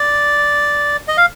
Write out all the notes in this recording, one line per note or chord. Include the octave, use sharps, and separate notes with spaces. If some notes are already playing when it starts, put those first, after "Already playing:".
Already playing: D5
D#5
F5